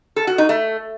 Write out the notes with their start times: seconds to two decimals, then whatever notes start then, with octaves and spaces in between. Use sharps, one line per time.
0.16 A4
0.27 F#4
0.38 D#4
0.49 A3